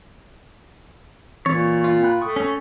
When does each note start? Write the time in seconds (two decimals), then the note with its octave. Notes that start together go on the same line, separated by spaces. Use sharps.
1.46 A#2 E3 C4 C#5 A6
1.84 F4
2.03 G5 B5 F#6
2.21 A3 G5 C#6 D#6
2.36 C#4